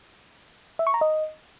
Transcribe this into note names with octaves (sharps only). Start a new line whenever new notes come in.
E5
C#6
A#5
D#5